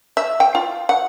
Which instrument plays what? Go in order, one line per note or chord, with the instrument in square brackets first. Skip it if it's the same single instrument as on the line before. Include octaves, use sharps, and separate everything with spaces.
[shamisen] E5
G5
F4
F#5